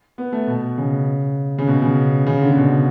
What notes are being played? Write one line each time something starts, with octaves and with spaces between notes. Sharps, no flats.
B3
A3
B2
C#3
C#3
B2
C#3
C#3
D3
C#3
B2